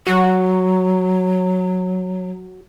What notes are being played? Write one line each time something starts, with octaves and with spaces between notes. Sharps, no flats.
F#3 F#4